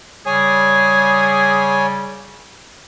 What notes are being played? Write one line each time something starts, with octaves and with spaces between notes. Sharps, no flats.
C#3 G3 G#4 C#5 G#5